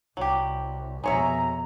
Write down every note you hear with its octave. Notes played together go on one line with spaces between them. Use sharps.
C2 F#3 G4
F2 B2 G#3 C#5 E5 A#5